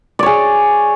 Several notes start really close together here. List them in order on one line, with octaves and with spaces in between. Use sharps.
D5 C#5 G#4